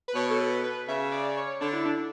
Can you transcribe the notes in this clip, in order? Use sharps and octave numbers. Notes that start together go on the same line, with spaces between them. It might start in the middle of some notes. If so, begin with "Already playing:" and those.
B4
B2 C#5
A4
B4
B4
C#3 E5
D5
C#5
D3 D4
E4
D4